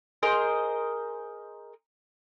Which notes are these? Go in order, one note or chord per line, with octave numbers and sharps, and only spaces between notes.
G#4 A#4 C5 D#5